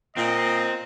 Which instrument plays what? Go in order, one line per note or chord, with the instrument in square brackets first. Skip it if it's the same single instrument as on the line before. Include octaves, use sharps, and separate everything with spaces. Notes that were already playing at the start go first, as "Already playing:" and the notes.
[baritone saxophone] A#2 [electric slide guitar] C4 [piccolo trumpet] D#5